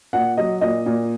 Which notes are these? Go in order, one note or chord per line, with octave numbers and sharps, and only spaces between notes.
A#2 F#5
F#3 D#5
A#2 D#5
A#2